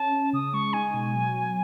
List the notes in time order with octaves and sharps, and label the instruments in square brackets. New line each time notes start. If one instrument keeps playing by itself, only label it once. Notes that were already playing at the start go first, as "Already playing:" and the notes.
Already playing: [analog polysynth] C#4 [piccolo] A5
[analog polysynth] C#4
[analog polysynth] C#3 [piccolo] D#6
[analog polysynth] G#3 [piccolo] C#6
[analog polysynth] D#4 [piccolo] G#5
[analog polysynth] B2
F#3
F#3